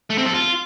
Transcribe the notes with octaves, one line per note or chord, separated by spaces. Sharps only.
A3
C4
A4
F4